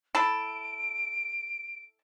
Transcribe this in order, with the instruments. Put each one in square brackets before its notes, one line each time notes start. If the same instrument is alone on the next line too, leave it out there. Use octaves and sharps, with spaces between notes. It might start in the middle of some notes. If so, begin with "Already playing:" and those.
[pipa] E4 A4 [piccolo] D7